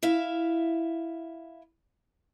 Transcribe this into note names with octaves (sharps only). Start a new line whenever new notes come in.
E4 E5 F5